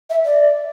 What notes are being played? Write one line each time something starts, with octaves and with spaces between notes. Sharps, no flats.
E5
D5